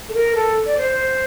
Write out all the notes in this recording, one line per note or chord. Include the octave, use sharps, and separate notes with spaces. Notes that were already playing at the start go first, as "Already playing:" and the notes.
A4
A#4
A4
D5
C5